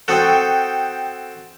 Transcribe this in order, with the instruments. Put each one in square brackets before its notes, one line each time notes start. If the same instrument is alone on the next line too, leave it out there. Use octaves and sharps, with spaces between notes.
[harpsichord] C4 F#4 A4 [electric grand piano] G5 D#6 F#6